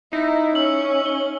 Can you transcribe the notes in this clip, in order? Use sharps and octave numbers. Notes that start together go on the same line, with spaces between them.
D#4 E4
C#4 E6 F#7
G7